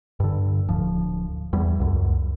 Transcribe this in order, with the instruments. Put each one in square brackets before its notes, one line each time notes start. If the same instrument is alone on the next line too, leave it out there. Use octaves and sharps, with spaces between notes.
[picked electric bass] G2 D3
D1 F3
E2 G3
C#2 F#2